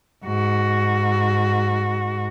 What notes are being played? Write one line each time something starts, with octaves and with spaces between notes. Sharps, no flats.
G#2 F#4